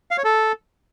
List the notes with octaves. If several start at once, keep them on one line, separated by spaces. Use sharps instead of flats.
F5
C#5
A4